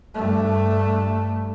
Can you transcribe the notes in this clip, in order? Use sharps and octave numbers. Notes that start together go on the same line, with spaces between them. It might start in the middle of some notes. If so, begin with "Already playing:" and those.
G2 A3